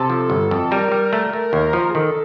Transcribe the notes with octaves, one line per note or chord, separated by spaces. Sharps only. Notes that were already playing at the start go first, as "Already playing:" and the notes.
Already playing: C3 A4
F3
G1
F2
G3 A#4
G3
A3
A3
D#2
F3
G#4
D#3 A4